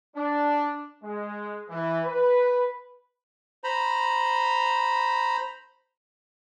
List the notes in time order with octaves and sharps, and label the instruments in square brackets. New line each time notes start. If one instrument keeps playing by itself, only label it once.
[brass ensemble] D4
G#3
E3
B4
[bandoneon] C5 A#5 B5